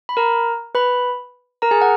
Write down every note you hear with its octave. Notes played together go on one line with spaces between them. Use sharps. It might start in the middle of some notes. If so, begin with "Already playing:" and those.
B5
A#4 A#5
B4 B5
A#4 A#5
G#4 G#5
F#5